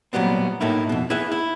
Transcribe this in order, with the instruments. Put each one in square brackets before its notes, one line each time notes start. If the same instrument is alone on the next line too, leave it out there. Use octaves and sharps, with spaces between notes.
[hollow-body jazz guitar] A#2 F#3 G3 B3 C4
A2 A3 A#3 D#4 E4
F2 B2
E4 G#4 B4 E5
E4